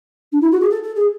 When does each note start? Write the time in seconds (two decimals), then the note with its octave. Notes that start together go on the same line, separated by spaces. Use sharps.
0.32 D4
0.41 E4
0.51 F#4
0.60 G#4
0.70 A4
0.83 A4
0.95 G#4